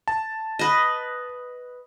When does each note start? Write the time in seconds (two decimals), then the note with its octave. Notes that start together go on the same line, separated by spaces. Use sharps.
0.08 A5
0.59 B4 D#5